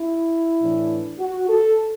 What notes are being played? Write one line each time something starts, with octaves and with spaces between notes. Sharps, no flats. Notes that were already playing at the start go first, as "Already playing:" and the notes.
Already playing: E4
A2 E3 D4
F#4
A4